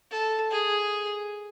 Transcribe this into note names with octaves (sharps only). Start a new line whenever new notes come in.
A4
G#4